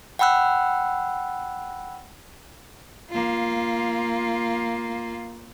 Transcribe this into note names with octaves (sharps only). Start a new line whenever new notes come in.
F#5 G5 B5 E6 F#6
A#3 F4